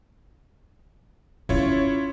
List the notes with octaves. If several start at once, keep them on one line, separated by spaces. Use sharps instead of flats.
C#4 E4 F4 C#5